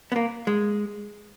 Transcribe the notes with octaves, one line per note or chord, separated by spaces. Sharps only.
B3
A#3
G#3